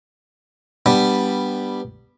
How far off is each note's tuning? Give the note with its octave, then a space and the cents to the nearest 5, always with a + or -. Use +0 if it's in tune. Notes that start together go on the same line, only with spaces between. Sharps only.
G3 +0 B3 -5 D4 +5